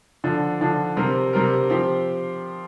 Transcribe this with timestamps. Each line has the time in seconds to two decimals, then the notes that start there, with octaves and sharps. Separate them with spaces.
0.24 D3 F3 D4
0.61 D3 F3 D4
0.97 C3 G3 C4 A#4
1.33 C3 G3 C4 A#4
1.70 F3 C4 G4